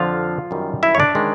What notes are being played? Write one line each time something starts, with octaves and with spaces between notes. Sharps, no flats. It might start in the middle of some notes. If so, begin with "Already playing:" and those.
Already playing: F2 D3 F3 F4 F5
F#2 D#3 G3
E4 E5
C#5
D4 D5
D#3 G#3 C#4